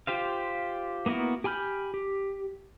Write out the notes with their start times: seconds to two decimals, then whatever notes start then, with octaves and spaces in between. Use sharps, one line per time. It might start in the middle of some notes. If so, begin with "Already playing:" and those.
0.07 F4 G4 C5 F5
1.06 A#3 B3 E4 F#4 A#4
1.44 G4 G#5 B5 F6 G6
1.94 G4